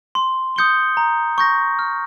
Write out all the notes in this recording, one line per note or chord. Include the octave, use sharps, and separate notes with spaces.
C6
D#6 G6 C#7 G7
A#5
C#6 G6 A#6
F6